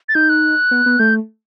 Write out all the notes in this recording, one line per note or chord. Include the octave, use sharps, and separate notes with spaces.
A6
D#4 G6
F#6
B3
B3
A3 G6